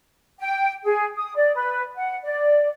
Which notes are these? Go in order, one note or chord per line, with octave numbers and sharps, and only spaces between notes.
G5
G#4
D#6
D5
B4
F#5
D5